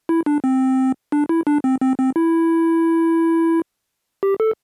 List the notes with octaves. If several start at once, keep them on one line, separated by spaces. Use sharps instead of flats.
E4
D4
C4
D4
E4
D4
C4
C4
C4
E4
G4
A4